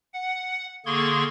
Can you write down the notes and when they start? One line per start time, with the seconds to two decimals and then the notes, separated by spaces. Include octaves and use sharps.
0.13 F#5
0.86 D3 A#3 G#4 C6 C#6 G#6